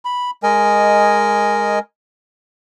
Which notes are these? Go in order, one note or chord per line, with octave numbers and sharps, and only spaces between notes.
B5
G#3 A#4 D#5 G#5